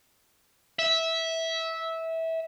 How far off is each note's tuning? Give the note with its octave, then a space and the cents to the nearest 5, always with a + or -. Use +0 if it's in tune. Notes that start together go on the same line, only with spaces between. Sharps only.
E5 -15